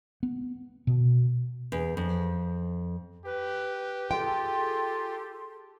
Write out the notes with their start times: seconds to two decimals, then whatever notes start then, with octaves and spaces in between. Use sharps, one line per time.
0.23 B3
0.87 B2
1.72 E2
1.97 F2
3.25 G4 B4
4.11 F4 G#4 A4 G5 C6